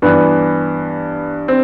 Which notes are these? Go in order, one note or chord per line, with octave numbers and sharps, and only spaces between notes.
G2 E3 B3
C4